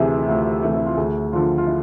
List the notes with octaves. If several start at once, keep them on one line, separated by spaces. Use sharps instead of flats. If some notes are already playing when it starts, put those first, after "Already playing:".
Already playing: D2 C3 E3 A3 G#4
E4
D2 F4
C3 E3 A3
E4
F4
D2 G#4
D3 F3 F4
F4
E4